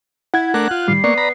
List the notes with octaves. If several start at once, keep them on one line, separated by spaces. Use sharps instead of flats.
E4 F#5 G#6
A3 D4 A#4 F#6
F4
A2 D#3 G3 C7
A#3 B3 D5 C#6
A#5 B5